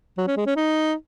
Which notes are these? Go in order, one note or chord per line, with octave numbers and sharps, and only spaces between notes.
F#3
C#4
G#3
C#4
D#4